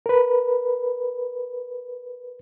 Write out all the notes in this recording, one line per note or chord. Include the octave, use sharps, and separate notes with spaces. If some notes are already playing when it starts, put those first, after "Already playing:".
A#4 B4